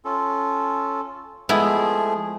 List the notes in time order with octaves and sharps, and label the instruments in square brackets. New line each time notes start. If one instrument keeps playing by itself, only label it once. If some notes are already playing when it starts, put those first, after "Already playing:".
[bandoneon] C#4 F4 A4
[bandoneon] F3 A3 G#4 [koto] G#3 B3 E4